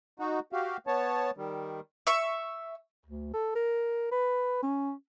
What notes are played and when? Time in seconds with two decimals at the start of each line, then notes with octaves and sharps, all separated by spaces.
0.19 D#4 F#4
0.52 F#4 G4 F5
0.87 B3 C#5 A5
1.37 D#3 G3
2.07 E5 C#6
3.06 D2
3.33 A4
3.55 A#4
4.12 B4
4.63 C#4